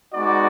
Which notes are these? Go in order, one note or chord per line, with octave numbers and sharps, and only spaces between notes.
G#3 B3 D#4 F#4 D5